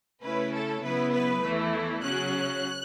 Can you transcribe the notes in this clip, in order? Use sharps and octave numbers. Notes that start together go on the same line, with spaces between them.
C#3 A3 C#4 E4 B4
A4
C#3 F#3 B3 E4 B4
B4
E2 E3 A3 E4
C#3 F#3 C#4 F#6